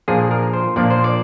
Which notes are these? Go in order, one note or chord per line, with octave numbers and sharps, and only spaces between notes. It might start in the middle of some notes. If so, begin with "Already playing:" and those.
A#2 F3 A#3 D4 G#4
A#4
C5
A#2 F3 A#3 D4 D5
C5
D5